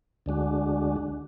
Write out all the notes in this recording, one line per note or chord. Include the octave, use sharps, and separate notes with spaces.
D2 D3 G#3 D4 F#4